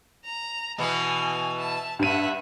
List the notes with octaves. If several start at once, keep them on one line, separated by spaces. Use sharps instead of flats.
A#5
B2 E3 B3 G#5
E5 A5
G2 E5 F#5 D#7